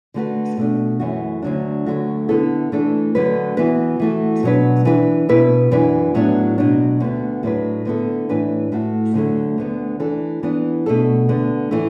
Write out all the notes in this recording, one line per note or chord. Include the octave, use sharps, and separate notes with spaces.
D3 A3 F#4 B4
B2 A3 D4
F#2 E3 A3 F#4
D2 D3 F#3 D4
D2 D3 F#3 A3 F#4
D3 B3 E4 A4
E3 A3 D4 A4
D2 D3 F#3 D4 B4
E3 B3 F#4 B4
E3 A3 F#4
B2 F#3 D4 B4
E3 D4 B4
B2 B3 E4 B4
F#2 E3 D4 B4
A2 F#3 B3 D4
B2 F#3 D4
D2 D3 B3
A2 F#3 D4 B4
D3 B3 E4 A4
A2 E3 D4 B4
A2 A3 F#4
D2 D3 F#3 A3
D2 D3 B3
E3 D4 A4
E3 B3 D4
B2 A3 D4 A4
D2 D3 B3 D4
A2 E3 A3